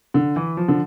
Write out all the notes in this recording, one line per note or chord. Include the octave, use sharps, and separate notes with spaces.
D3
E3
F3
D3